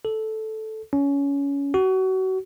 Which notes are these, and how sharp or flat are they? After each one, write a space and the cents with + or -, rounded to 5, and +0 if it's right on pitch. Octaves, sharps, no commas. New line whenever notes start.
A4 -5
C#4 +20
F#4 +30